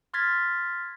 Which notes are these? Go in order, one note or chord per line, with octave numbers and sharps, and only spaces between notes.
C6 F6 G#6 A6 B6